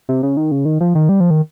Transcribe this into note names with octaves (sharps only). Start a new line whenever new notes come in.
C3
C#3
D#3
C#3
D#3
F3
D#3
G3
F3
D#3